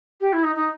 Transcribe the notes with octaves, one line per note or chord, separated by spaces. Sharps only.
G4
E4
D#4
D#4